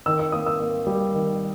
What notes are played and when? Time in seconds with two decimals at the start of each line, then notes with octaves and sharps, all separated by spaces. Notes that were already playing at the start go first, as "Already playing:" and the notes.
0.06 D#3 E6
0.19 E6
0.32 A#3 D#6
0.46 E6
0.60 A#3
0.87 G3
1.14 D#3